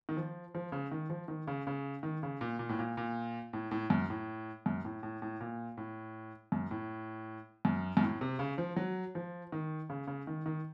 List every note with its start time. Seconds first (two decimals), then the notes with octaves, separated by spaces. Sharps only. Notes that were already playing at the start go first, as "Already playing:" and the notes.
0.09 D#3
0.17 F3
0.55 F3
0.72 C#3
0.92 D#3
1.10 F3
1.28 D#3
1.47 C#3
1.67 C#3
2.03 D#3
2.23 C#3
2.41 A#2
2.59 A#2
2.69 A2
2.79 A#2
2.97 A#2
3.53 A2
3.71 A2
3.90 F#2
4.10 A2
4.66 F#2
4.85 A2
5.03 A2
5.22 A2
5.40 A#2
5.77 A2
6.52 F#2
6.71 A2
7.65 F#2
7.97 F#2
8.03 A2
8.21 C3
8.39 C#3
8.58 F3
8.76 F#3
9.15 F3
9.52 D#3
9.90 C#3
10.07 C#3
10.27 D#3
10.46 D#3